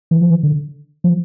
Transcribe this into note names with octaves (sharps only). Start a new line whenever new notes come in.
E3
F3
E3
D3
F3